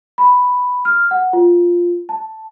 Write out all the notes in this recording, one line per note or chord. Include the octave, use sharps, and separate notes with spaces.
B5
F6
F#5
F4
A5